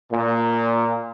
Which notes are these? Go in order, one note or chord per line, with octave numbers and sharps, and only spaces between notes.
A#2